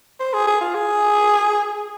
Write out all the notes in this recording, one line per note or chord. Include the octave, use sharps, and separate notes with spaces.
C5
G#4
G#4
F4
G#4